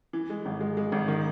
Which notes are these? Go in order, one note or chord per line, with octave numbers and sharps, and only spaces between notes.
E3
G#3
G#1
G#3
G#3
G#1
D#3